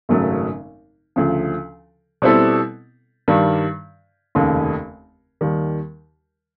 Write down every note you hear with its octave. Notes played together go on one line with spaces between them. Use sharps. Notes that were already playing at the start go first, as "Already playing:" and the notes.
G#1 F#2 C#3 F#3 A3
D2 C#3 F3
B2 G3 C4 E4 A4
G2 D#3 G3
F1 D#2 C#3
D#2 D#3 G3